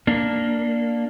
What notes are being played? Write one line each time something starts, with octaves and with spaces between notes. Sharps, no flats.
A#3 D4